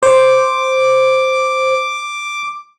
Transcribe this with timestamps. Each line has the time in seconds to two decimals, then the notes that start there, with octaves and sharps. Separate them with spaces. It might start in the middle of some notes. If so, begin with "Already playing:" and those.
0.03 C5 D6